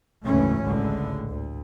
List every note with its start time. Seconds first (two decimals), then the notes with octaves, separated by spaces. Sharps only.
0.24 F#1 D2 G#2 E3 A3 C#4
0.63 G#1 C#2 A2 D3 G#3
1.26 D2